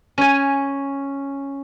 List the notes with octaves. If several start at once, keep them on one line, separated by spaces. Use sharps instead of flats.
C#4 G#5